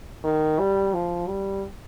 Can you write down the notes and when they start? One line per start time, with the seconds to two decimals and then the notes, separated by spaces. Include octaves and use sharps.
0.24 D#3
0.59 G3
0.93 F3
1.28 G3